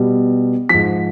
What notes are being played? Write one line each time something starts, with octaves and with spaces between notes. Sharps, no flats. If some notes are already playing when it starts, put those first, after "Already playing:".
Already playing: B2 G3
G#2 F3 B6